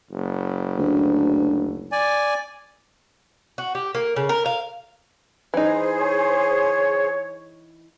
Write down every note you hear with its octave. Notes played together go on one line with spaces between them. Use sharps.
F#1
D2
D5 G#5
F#4
G4
A#3
C#3
A#4
F5
E3 D#4 G#4 C5
C#5